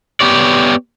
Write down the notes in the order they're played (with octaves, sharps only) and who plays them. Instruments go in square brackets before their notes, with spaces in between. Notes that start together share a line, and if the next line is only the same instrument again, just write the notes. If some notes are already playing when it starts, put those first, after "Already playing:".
[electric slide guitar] B3 G4 C#5 D5